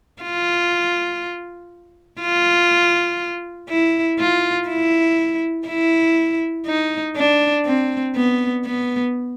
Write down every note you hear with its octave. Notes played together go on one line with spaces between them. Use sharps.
F4
F4
E4
F4
E4
E4
D#4
D4
C4
B3
B3